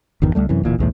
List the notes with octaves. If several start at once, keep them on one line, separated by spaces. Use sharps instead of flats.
G1 E2 D#3
C#2 G#2 G3 A3
F#2 C3 E3
D1 A#2 E3
B1 E2 A2